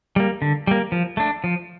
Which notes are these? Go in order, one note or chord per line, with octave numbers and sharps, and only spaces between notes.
G3 A#3
D3
G3 A#3
F3
A3 D4
F3